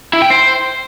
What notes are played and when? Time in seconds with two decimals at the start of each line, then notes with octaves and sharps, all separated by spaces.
0.13 E4
0.22 G5
0.30 C5